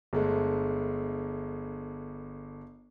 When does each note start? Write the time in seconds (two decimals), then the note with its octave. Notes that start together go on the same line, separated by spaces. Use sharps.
0.13 G1 G#3 A3